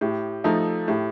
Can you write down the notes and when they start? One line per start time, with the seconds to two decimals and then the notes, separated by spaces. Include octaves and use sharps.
0.01 A2 G4
0.44 F3 A3 D#4 A4
0.88 A2 G4